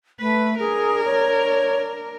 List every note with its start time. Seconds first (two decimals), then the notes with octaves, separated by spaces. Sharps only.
0.20 A3 B4
0.59 D4 G#4 A#4
1.06 C#5